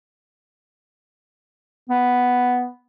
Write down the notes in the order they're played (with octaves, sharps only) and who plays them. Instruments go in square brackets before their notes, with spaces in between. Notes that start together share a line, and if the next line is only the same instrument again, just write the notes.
[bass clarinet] B3